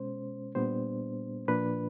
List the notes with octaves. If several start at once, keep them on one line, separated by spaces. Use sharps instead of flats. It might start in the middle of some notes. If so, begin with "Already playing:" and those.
Already playing: B2 G#3 C#4 C5
A#2 G3 B3 D4 C5
A#2 F3 A#3 D4 B4